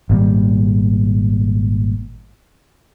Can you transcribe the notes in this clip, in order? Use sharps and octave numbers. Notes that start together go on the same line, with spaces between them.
G#1 A#2 G3